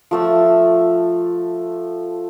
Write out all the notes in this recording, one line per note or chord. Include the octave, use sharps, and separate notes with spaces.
F3 A3 E6